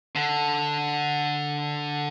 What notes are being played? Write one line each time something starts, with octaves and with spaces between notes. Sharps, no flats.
D3